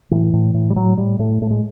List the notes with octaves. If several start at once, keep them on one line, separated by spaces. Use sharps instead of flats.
A2 E3
A2
A2
G3
A2 F#3
A2 G3
A2 A3
A2 A3
G#3